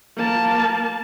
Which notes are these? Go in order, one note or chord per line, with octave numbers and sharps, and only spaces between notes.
A#3 A5